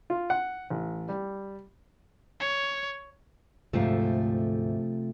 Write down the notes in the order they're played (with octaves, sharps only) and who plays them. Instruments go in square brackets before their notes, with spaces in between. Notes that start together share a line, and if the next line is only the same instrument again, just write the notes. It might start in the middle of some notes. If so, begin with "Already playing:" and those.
[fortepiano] F4
F#5
A1
G3
[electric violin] C#5
[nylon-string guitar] D2 G#2 F5 [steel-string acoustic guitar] C3 F3 A3